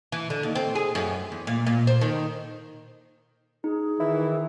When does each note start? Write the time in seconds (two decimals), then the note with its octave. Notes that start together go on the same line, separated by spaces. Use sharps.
0.12 E3
0.30 D3
0.43 D#2
0.55 C4
0.75 G#4
0.95 F#2
1.32 E2
1.47 A#2
1.66 A#2
1.87 C5
2.01 D#3
3.64 D#4 G#4
4.00 D#3 E3 E4